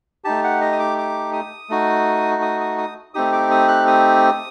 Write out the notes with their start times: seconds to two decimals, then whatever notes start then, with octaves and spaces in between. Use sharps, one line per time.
0.24 A3 D#4 G4 A5
0.44 F#5
0.61 D#5
0.73 D#6
0.79 D6
0.98 D6
1.33 D#6
1.69 A3 D#4 F#4
2.42 D#6
2.60 D#6
2.78 D#6
3.14 A3 C4 D#4 G4 D#6
3.33 D6
3.51 D#6
3.68 F#6
3.87 D#6